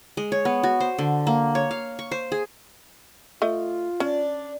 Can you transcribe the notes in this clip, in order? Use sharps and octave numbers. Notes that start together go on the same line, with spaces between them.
G#3
C#5
B3
F#4
C5
D3
A#3
C#5
F5
C#6
C5
G#4
A3 F4 D#5
C#4 D4